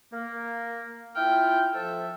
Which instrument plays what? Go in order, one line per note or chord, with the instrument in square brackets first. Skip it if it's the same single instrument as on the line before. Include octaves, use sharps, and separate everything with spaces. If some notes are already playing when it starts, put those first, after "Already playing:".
[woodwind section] A#3
[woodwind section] E4 F4 F6 [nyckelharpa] G5
[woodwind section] F3 A4 [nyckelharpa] E5